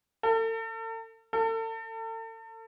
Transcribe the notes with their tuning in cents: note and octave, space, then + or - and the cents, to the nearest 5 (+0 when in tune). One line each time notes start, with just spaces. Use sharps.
A4 +40
A4 +35